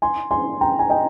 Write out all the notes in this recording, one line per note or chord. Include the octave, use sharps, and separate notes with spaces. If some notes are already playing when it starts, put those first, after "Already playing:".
G#5 C6
G#5 C6
G5 A#5
G#5
D#5 G5